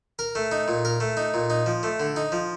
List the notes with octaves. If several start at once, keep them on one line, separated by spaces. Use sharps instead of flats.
A#4
A3
D#4
A#2
A#4
A3
D#4
A#2
D#4
F3
A3
D3
D#4
F3